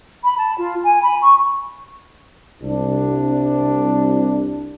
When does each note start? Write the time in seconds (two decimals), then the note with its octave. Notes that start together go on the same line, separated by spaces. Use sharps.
0.24 B5
0.37 A5
0.58 F4
0.83 G#5
1.02 B5
1.21 C#6
2.62 C2 D4